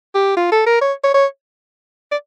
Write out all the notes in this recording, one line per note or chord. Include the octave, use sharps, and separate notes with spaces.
G4
F4
A4
A#4
C#5
C#5
C#5
D5